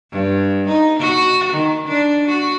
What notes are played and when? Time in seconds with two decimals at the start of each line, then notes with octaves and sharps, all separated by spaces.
0.12 G2
0.68 D#4
1.00 F#4
1.53 D#3
1.88 D4
2.28 F#4